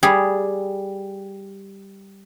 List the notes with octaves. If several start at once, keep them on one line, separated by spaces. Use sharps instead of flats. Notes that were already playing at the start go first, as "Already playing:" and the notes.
G3 G#4